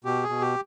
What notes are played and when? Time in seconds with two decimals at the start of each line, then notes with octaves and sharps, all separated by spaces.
0.05 B2 G4
0.23 G#4
0.29 B2
0.41 G4